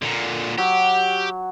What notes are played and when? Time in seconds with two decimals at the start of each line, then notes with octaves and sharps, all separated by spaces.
0.02 A#2 D3
0.58 F#3 G4